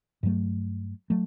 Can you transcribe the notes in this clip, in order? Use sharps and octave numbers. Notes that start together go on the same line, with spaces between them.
G2 F#3 A3
F#3 A3